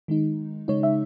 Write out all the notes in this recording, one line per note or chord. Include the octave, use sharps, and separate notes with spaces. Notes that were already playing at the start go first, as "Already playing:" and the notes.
D#3 G#3 D#4
C#3 G#3 D#4 C#5
E5